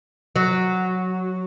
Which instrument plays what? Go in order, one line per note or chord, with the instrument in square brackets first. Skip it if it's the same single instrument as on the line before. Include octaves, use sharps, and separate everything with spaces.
[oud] F#3